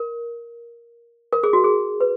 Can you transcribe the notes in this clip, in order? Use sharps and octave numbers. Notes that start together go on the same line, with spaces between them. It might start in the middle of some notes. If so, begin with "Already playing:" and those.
Already playing: A#4
A#4
G#4
F#4
G#4
B4